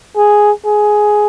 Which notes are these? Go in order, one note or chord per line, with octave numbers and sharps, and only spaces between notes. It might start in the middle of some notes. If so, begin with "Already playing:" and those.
G#4
G#4